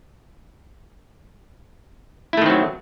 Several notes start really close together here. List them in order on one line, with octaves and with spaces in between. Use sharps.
E4 A3 D#3 C4 F#3